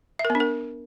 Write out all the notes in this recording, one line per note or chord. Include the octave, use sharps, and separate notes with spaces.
E5
A#4
B3
D4
A#4